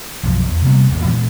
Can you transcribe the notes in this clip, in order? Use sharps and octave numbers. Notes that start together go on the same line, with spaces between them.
B1 F#2 F3
E2
C3 G3 A#3 B3
G#1 D#2 A2
A#2 E3 G#3 B3